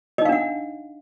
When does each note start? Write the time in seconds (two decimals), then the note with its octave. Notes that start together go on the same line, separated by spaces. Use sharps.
0.18 D#5
0.22 D#4
0.25 F5
0.29 D4
0.32 F#5